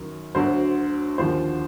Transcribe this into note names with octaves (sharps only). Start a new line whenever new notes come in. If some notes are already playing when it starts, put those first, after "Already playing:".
Already playing: F#2 D#3 F#3
D2 D3 F#3 C5
D#2 D3 F3 C5